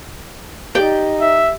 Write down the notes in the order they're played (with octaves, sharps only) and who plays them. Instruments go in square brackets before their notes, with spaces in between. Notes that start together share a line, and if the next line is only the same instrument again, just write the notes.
[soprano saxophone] D#4 [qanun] G4 D5 G5
[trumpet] E5